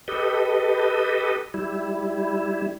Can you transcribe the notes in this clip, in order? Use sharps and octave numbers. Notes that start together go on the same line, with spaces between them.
G4 A4 B4 D#5
G3 E4